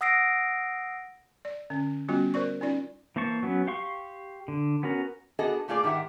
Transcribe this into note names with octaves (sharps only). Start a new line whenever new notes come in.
F#5 D#6 E6 A#6 C7 D7
D5
D3 C#4
G3 B3 C#4 F4 F#4
A#4 C5 D5 C#6
C#4 D#4 F4 D5
E3 A#3 C5 A5 C#6
F#3 B3 C#4
G4 F5 C6 C#6
D3
B3 C#4 F#4 A#4
B3 D4 F#4 G#4 A4 D#5
A#2 A3 F4 G#4 D5
G#2 D#3 G4 E5 F#5